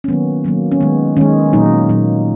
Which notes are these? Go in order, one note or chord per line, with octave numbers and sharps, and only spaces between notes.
C#4
D#3 F#3 A#3 B3
D#3 F#3 A#3
C#4
D#3 G#3 B3
D#3 G#3 C#4
A#2 F#3 A#3 D#4
A#2 F#3 A#3